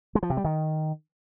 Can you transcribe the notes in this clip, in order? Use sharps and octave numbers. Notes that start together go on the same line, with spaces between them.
G#3
F3
C3
G3
D#3